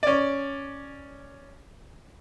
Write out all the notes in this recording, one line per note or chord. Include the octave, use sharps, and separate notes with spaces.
C#4 D5